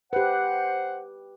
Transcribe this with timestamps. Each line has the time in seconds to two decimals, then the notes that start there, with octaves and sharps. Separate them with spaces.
0.13 G4 B4 C5 F#5